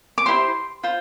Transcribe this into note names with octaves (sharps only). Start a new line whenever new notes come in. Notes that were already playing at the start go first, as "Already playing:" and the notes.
D6
E4 G4 C5 C6
F4 C5